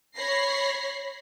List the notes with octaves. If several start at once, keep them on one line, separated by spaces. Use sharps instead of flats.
C#5 B5 A#6 C7